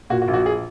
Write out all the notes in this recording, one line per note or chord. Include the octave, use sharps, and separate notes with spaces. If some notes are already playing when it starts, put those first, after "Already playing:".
A#2 F#4
F#4
A#1
F#4
G#4